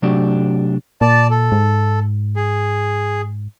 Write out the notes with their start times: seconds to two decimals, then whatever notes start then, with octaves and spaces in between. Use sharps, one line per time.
0.02 C3 F#3 A3 D4 F#4 G4
1.01 A#2 D5 A5
1.31 A4
1.52 G#2
2.36 G#4